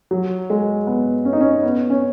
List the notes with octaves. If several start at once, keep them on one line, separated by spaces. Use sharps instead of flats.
F#3
G#3
B3
C#4
D#4
C#4
B3
C#4